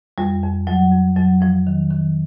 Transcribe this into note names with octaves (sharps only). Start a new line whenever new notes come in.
F2 G3
F2
F2 F#3
F2
F2 F#3
F2 F3
D#3
D#3